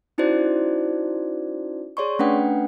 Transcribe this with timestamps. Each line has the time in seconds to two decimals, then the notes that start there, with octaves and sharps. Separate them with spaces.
0.18 C#4 D#4 E4 F#4 C5 D5
1.97 G#4 C#5 D5 C6 C#6
2.19 A3 C#4 D4 B4 F#5 G5